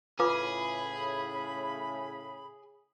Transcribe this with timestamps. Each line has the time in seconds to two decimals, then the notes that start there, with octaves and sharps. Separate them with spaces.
0.20 A2 C#3 F4 G#4 B4 B5 D6